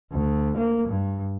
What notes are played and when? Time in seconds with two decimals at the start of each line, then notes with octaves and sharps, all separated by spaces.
0.12 D2
0.57 A#3
0.88 G2